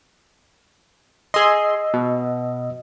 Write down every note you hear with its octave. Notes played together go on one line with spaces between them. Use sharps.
G#4 D#5 C6 E6
B2